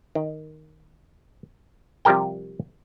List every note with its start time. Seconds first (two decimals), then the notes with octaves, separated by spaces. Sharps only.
0.15 D#3
2.05 C3 F3 G3 G4 A#4 G5